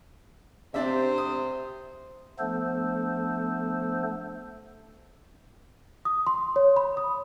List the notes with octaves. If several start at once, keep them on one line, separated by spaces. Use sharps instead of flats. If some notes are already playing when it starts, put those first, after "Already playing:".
C3 C4 D4 C5 E5
D#6
F3 A3 B3 D4 A4 C5
D#6
C6
C#5
B5
D#6